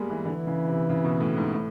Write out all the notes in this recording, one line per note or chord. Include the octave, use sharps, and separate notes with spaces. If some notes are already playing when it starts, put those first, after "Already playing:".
Already playing: G3 G#3 A#3 B3
E3
D3 E3
C#3
C3
C#3
B2
A2
G#2
A2